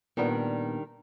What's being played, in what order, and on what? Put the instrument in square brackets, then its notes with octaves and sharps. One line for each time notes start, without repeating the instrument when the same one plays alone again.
[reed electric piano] A#2 B3 [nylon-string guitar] D#3 G3 D4